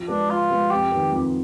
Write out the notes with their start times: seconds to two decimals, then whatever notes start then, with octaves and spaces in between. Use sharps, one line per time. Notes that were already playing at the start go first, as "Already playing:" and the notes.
Already playing: F3
0.08 G#3 B3 D4
0.29 F3 F4
0.50 G#3 B3
0.70 F2 G4
0.91 D#3 B3
1.12 F2